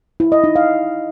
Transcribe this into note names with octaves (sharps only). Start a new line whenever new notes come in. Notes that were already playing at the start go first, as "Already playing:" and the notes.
E4
D#5
D#4
F5